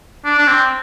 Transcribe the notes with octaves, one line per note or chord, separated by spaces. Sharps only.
D4
D4
C4